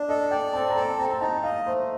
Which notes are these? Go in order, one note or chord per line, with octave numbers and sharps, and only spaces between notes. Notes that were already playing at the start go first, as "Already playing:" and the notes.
Already playing: D4 D5
A4 D#5
D5 G5
C4 A5
A#5
A4 A5
C4 A#5
A5
D#4 A#5
D#5 F5
A3 C5